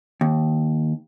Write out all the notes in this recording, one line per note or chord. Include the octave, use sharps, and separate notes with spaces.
D#2